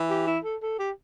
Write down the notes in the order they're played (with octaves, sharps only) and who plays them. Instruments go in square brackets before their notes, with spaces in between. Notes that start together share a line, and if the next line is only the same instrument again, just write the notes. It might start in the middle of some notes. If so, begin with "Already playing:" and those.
Already playing: [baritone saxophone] E3
[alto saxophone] G4
E4
A4
A4
G4